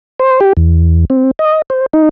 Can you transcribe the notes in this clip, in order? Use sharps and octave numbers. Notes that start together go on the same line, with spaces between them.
C5
G4
E2
C4
D#5
C5
D#4